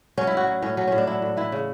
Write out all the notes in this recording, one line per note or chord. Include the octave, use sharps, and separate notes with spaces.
F#3 C#4
E4
A2 F#4
F#3
A2 C#4
F#3 C#4
A2 C#4
D4
F#3 E4
A2
E3 E4
C#3